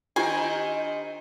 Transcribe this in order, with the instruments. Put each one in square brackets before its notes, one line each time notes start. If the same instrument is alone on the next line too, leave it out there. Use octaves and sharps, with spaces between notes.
[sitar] D#3 C4 D#4 [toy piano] D4 F4 G4 [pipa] G#5